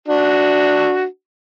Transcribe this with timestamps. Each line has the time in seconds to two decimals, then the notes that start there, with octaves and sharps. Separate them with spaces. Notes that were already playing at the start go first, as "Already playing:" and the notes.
0.08 D4 F#4